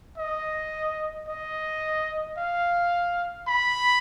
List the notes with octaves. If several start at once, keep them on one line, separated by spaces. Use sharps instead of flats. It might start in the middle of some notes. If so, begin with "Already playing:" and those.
D#5
D#5
F5
B5